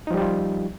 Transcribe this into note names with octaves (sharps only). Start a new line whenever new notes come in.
F3 G3 D#4 F4 G4